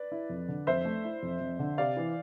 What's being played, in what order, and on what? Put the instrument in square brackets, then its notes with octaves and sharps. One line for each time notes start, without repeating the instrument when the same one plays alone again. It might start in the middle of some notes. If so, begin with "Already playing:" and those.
Already playing: [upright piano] B4 D5
[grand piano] E4
F2
D3
[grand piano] F2 [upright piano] C5 E5
[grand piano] A3
E4
F2
F2
D3
[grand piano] C3 [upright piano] D5 F5
[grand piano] E3